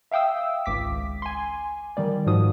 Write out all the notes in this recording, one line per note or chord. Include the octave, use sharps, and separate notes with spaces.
E5 F5 G5 D#6 E6
G#1 C#2 D6 B6
G#5 C6
D#3 G3 D5
G#2 F3 F#4 D#6